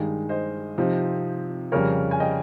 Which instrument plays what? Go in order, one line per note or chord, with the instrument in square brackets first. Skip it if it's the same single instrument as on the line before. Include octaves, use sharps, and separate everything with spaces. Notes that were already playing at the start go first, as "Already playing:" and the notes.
Already playing: [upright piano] G2 D#3 G#3 D#4
C5 D#5
C3 F3 C4 D#4
F2 C#3 G3 A#4 C#5
G#5
D#5 G5